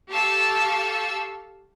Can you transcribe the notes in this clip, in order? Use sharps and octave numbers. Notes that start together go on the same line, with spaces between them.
G4 A4 F5 A5 C#6 E6